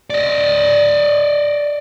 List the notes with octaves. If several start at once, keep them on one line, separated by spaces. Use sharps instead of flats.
D5 D#5